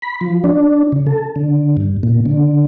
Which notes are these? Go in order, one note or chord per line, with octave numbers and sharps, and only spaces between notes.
B5
F3
D4
C#3
A4
D3
G2
A#2
D3